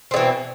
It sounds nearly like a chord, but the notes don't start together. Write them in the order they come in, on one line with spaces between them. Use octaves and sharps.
C4 D3 E3 B2